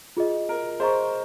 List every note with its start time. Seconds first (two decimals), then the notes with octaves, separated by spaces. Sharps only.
0.17 F4 G#4 D#5
0.49 A#4
0.80 G#4 C5 D#5 A#5 C#6